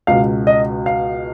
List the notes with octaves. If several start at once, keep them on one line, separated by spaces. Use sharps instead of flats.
C#2 B2 F5
D#5
F5